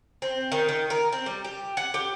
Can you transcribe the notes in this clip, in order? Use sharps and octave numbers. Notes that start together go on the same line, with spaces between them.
C4
D#3
D#3
A#4
C4
G3
G4
F#5
G4